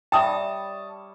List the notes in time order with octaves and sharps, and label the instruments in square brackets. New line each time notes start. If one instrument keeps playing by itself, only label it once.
[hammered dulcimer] G3 C#5 D6 [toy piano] E5 G5 [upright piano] A5 D#6